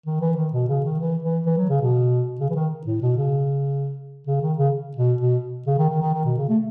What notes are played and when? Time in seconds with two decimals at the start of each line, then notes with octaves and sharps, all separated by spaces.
0.06 D#3
0.21 E3
0.37 D#3
0.53 B2
0.68 C#3
0.84 D#3
0.99 E3
1.23 E3
1.46 E3
1.57 F#3
1.69 C#3
1.82 B2
2.40 C#3
2.50 E3
2.56 D#3
2.87 A2
3.02 B2
3.17 C#3
4.27 C#3
4.42 D#3
4.58 C#3
4.97 B2
5.21 B2
5.67 C#3
5.78 D#3
5.90 D#3
6.02 D#3
6.14 D#3
6.25 B2
6.38 C#3
6.49 A3